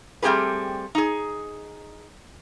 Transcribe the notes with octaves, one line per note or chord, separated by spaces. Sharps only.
G3 A3 C4 G4 G#4 B4
D#4 G#4